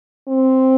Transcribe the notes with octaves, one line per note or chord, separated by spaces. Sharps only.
C4